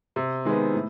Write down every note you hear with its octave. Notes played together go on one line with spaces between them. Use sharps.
C3
D#3 G#3 B3
A2